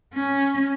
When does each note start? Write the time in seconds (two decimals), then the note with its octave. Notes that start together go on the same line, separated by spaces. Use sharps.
0.14 C#4